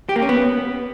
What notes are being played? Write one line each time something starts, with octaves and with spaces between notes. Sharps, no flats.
G4
A#3
C#4
B3